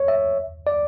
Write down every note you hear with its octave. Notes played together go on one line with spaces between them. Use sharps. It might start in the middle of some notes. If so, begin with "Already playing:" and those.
Already playing: C#5
E5
D5